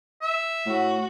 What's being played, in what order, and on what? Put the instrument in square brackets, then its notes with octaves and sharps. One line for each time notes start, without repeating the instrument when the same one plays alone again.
[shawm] E5
[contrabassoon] A2 [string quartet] F#4